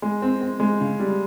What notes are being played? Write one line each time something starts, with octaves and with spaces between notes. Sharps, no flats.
G#3
C4
C4
G#3
C#3
G3